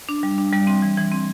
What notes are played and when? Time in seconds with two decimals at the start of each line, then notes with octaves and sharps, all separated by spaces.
0.09 D4
0.23 G3
0.38 D4
0.53 G3
0.67 C4
0.82 E3
0.97 E3
1.12 C4